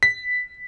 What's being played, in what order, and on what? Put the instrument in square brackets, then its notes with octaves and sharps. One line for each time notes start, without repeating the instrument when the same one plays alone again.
[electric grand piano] B6